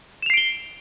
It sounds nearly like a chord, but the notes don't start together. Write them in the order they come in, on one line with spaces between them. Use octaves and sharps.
E7 F7 C7 D7 G7